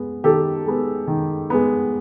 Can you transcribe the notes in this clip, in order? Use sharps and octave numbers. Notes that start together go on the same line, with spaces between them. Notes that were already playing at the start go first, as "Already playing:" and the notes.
Already playing: G#3 B3
D#3 G4 A4
G#3 B3
D#3
G#3 B3